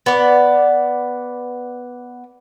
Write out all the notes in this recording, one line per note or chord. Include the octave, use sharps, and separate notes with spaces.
B3 D5